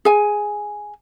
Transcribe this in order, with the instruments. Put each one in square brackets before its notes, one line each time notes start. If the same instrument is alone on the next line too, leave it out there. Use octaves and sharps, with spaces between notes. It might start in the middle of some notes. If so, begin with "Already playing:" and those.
[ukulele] G#4 G#5